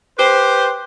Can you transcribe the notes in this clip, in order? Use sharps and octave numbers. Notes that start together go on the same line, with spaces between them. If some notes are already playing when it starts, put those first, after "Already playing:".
G4 B4 C5